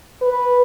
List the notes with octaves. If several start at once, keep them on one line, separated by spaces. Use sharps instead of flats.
B4